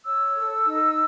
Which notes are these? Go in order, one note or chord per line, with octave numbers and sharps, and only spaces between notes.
C#5 E6
A4
D#4